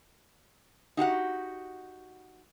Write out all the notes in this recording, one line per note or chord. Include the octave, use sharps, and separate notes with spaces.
D#4 F#4 G4 F#5